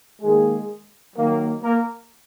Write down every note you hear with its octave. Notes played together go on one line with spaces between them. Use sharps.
D#3 G#3 A#3 G#4
D#3 F#3 A#3
A#3 A#4